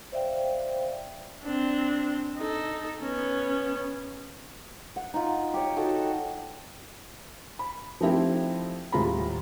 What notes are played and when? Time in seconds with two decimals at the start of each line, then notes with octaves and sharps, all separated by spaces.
0.12 C5 D5 E5 F5 G5
1.43 C4 D4
2.38 D#4 A4
3.01 B3 C#4
4.96 F#5
5.14 D#4 F4
5.54 G4 C#5
5.76 D#4 F#4 A4
7.59 B5
8.01 F3 A3 C4 D#4 E4 G4
8.92 D#1 A2 G#3 F4 A#5 B5